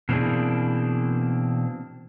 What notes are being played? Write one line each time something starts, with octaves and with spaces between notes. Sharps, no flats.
B2 E3 A#3 C4 D4 G#4